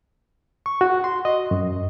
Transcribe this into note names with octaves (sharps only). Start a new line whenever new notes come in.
C#6
F#4
C6
D#5
F#2